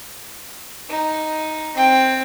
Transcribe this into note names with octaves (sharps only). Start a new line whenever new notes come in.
D#4
C4 G5